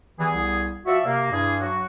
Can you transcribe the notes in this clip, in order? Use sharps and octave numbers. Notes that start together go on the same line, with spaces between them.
E3 G3 B3 G#4
C2
F3 F#4 D5 E5
C3 A#3
G2 D4 E4 G#4
F#3 F#4